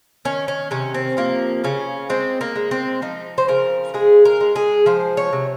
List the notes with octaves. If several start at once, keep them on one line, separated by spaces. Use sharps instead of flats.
D#3 C#4
C#4
C3 C#4
C4
F3 A#3
C#3 C#4
G#3 C4
A#3
G#3
C4
F3 D#4
C5
C#3 A#4
G#3 G#4
A#4
G#3
G#4
F3 C5
C#5
C3